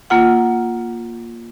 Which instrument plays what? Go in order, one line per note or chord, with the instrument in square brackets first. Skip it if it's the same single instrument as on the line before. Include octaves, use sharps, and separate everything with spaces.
[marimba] A#3 F4 F#5